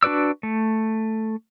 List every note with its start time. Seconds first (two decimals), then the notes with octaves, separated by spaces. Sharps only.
0.03 D4 F#4 B4 D5 E6
0.43 A3